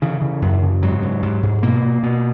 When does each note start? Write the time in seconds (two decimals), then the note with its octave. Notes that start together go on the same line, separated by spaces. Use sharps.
0.02 C#3 E3
0.22 C#3
0.42 F#2
0.62 C#3
0.82 G#2 F#3
1.03 G#2
1.22 G#2
1.43 G#2
1.63 B2 A#3
1.83 B2
2.03 B2